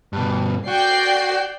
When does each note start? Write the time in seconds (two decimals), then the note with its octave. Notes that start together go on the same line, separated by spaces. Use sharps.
0.13 G2 B2
0.68 F#4 D5 G5 C7